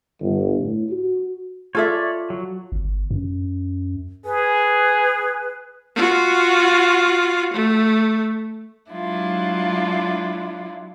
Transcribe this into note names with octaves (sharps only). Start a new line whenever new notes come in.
G1
A2
F#4
F4 A4 C#5 D5 E5
F#3
G1
F#2
G#4 B4
F4 F#4
A3
F#3 G#3 D4 E4 F4